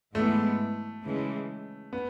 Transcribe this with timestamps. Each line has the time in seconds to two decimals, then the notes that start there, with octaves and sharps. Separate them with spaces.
0.14 G#2 E3 G#3 A3 B3
1.04 C#3 E3 G#3
1.93 B3